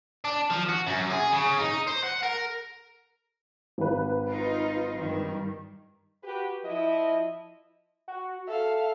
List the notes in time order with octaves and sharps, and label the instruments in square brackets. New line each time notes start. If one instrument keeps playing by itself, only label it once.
[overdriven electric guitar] D4
F3
F#4
F#2
G#4
C#3
D#4
C5
F#5
A#4
[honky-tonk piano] G#1 B4
[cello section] D#4 F4
G2 D#3 G3
[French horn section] F#4 G4 B4
F3 E4 D#5
[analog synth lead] F#4
[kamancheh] A4 F5 [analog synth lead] E5